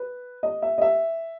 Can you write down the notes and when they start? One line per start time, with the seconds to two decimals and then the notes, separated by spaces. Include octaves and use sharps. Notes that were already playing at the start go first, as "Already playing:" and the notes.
Already playing: B4
0.43 D#5
0.62 E5
0.78 D#5
0.82 E5